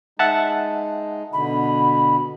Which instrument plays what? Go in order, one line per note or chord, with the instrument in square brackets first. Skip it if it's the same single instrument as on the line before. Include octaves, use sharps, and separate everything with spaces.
[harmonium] G#3 D#4 [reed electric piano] E5 F#5 A5
[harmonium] B2 D3 [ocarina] B5